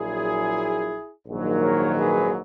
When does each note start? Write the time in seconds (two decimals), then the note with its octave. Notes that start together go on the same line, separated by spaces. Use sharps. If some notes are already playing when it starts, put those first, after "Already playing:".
Already playing: A#1 A#2 F#3 E4 G#4
1.27 A#1 G#2 D#3 F#3 A#3
1.62 A#4 C#5
1.98 G#4 B4